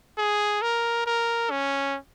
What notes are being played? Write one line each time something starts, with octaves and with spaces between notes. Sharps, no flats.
G#4
A#4
A#4
C#4